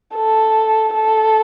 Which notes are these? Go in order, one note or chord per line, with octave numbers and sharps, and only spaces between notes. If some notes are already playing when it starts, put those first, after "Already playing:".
A4
A4